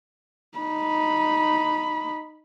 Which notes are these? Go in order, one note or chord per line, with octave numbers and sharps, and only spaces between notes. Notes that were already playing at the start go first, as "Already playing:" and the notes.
D#4 B5